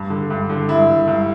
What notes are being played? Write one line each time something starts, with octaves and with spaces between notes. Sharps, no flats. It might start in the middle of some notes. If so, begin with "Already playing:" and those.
Already playing: G2
D3
G2
D3
G2 E4
D3
G2